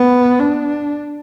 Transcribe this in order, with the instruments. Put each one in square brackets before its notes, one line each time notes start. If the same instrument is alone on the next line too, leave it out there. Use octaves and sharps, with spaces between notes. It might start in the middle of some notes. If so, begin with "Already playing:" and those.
Already playing: [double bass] B3
D4